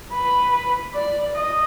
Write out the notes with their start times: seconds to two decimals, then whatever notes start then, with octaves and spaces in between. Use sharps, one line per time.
0.13 B4
0.95 D5
1.35 D#5